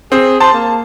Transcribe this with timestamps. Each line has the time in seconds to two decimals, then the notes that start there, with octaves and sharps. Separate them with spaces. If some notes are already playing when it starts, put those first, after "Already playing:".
0.12 C4 G#4
0.40 C5 A5
0.54 A#3